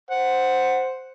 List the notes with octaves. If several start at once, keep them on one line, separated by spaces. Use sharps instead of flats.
C5 F#5